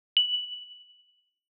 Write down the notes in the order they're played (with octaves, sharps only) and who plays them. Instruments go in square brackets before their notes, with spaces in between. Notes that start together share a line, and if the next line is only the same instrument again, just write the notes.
[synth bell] F#7